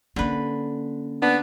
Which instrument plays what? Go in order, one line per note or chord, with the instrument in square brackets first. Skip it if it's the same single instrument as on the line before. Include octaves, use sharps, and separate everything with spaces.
[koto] D3 B4 [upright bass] A#3 C#4
[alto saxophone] B3 [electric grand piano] D4